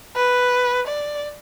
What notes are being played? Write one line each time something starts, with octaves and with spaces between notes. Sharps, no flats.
B4
D5